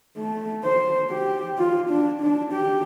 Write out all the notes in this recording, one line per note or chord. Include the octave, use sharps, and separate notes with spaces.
A3
C5
G4
F4
D4
D4
G4